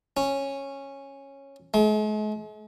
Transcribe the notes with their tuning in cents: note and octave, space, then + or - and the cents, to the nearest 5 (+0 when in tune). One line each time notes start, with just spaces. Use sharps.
C#4 -10
G#3 +45